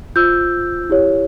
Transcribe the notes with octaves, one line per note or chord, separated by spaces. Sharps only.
F4 C5 E6 G6
E4 G4 C#5